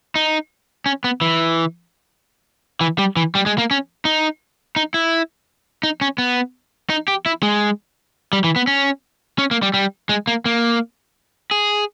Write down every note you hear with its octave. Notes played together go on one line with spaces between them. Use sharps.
D#4
C#4
B3
E3
E3
G3
E3
G3
G#3
A#3
C#4
D#4
D#4
E4
D#4
C#4
B3
D#4
G4
E4
G#3
G3
E3
B3
C#4
C#4
A#3
G3
G3
G#3
A#3
A#3
G#4